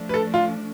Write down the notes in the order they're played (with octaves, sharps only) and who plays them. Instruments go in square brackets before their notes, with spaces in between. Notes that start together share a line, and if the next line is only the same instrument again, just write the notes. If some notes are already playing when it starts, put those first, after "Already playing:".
Already playing: [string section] F3 A3 D4
[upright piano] B4
A4
F4